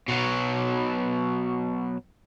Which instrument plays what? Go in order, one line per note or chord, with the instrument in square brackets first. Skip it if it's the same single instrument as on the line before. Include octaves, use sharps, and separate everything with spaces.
[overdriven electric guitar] B2 F#3